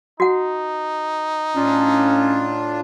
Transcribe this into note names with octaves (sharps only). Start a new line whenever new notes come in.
D#4 F#4 F#5
A2 C#4 D4 F4